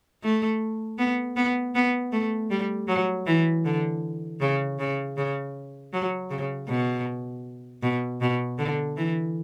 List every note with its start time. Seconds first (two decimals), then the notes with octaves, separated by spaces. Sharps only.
0.23 A3
0.98 B3
1.36 B3
1.75 B3
2.12 A3
2.50 G3
2.88 F#3
3.26 E3
3.65 D3
4.40 C#3
4.79 C#3
5.17 C#3
5.93 F#3
6.30 C#3
6.68 B2
7.83 B2
8.21 B2
8.58 D3
8.97 E3